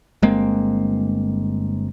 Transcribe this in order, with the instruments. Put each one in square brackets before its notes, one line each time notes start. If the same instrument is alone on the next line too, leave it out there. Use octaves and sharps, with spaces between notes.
[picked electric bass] G1 G#3 A#3 C4